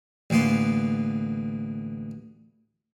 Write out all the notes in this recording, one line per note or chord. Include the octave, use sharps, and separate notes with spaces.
A1 D2 A#3 B3 C6